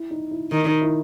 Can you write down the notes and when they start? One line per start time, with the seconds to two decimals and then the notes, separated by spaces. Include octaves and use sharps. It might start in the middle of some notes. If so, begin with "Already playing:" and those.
Already playing: E4
0.11 D#4
0.31 E4
0.51 D#3 D#4
0.67 D#4
0.82 E4